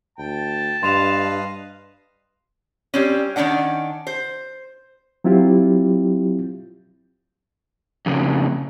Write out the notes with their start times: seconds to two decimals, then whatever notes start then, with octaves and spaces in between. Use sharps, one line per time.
0.18 D2 G5 A5
0.83 G2 B4 D#5 F5 C6 E7 F7
2.94 G3 C4 C#4
3.36 D#3 A3 C#4 D4 F#5
4.07 C5
5.24 F#3 C4 E4 F4 G4
8.06 F2 C#3